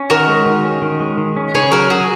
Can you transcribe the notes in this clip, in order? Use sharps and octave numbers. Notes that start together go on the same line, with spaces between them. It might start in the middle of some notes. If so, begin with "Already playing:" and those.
Already playing: C#4
D#3 F#4 A#4
G#3
D#3
C#4
D#3
G#3
D#3
C#4
C#3 G#4 C#5
F#3 F#4 A#4
F#4 G#4